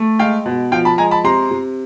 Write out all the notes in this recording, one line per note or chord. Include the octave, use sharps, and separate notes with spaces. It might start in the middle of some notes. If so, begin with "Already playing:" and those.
Already playing: A3
G#3 F5 G5
B2
F3 F5 G5
A5 B5
G#3 G#5 A#5
A5 B5
C3 A#5 C6
C3